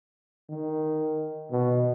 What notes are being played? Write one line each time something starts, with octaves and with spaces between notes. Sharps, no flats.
D#3
B2